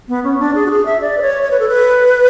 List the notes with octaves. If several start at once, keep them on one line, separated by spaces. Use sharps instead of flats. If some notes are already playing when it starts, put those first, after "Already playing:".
B3
C#4
D4
G#4
F#4
G#4
E5
D5
B4
C#5
C#5
B4
A4
B4